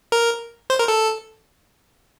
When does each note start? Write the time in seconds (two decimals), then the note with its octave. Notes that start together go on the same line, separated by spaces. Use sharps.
0.12 A#4
0.70 C5
0.79 A#4
0.88 A4